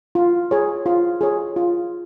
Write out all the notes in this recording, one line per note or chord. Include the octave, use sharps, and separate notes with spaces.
F4
G#4 C#5
F4
G#4 C#5
F4